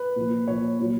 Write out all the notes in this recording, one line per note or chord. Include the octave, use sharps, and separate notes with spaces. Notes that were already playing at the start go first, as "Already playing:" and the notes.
Already playing: B4
A#2 F3
A#2 F3 C#5
A#2 F#3